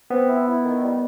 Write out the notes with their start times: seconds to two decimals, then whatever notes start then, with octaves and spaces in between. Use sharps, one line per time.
0.10 B3 C4
0.28 E4
0.46 E4
0.64 D#3
0.82 G3